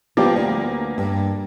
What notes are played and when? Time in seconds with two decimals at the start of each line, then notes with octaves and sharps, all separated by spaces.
0.17 F3 G3 A#3 B3 G4
0.36 D2
0.98 G2